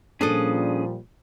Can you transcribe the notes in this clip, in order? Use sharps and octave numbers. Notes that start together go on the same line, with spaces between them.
A#2 F3 G3 C#4 D4 G#4 A4 D#6